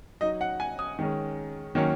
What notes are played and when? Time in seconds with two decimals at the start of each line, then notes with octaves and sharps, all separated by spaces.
0.21 F#3 D#4 D#5
0.41 F#5
0.60 G#5
0.79 D#6
0.99 D#3 G#3 C#4
1.75 D#3 F#3 A#3 C#4